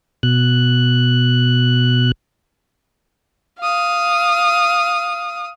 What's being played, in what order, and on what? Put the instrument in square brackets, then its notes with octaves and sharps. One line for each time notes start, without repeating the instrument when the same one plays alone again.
[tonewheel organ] B2 F#6
[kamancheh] F5 D#6